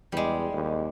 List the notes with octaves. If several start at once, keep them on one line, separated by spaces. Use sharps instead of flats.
E2 G3 G#3
D#2